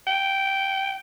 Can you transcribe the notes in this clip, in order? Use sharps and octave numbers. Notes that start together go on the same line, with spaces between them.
G5